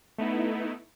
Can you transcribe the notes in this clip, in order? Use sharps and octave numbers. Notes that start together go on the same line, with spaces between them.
A3 B3 D#4 E4